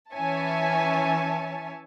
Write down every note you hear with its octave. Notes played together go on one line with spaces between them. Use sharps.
E3 C#4 C#5 E5 G#5 A5